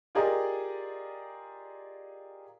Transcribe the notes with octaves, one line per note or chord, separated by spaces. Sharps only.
F4 G4 G#4 A#4 D5 D#5